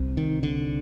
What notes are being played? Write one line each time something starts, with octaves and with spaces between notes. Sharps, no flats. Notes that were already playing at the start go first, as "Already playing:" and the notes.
Already playing: C2 C3
D#3
D3